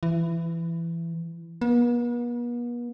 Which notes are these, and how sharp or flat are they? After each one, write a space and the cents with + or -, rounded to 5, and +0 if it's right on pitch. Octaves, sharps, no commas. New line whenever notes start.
E3 +20
B3 -45